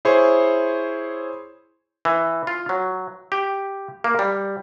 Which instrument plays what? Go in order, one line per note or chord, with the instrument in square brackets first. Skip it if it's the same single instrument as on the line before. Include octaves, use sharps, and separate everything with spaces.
[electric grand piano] E4 G#4 C5 C#5 C6 C#6
[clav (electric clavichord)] E3
F4
F#3
G4
A#3
G3